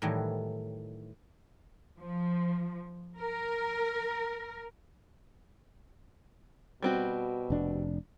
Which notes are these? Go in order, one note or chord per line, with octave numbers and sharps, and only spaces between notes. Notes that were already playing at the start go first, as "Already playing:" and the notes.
A2 D#3 E3 F#3 G3
F3
A#4
B2 G3 C4 F#4
F1 D4